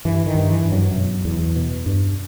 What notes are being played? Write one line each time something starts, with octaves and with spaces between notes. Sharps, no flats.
G2 E3
D#3
G2
E3
G2
F#2 F#3
B2
E2
B2
G2